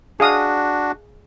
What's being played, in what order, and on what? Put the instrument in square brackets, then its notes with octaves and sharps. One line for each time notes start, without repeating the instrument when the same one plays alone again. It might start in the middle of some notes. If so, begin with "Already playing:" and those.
[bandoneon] D4 F#4 [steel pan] G#4 F5 D#6